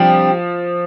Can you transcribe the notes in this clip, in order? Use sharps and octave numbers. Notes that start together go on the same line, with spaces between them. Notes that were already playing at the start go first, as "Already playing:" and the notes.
Already playing: C3 F3 G3 D4 G4